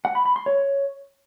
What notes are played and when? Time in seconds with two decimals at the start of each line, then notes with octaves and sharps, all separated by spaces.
0.05 F#5
0.15 B5
0.26 B5
0.36 C6
0.46 C#5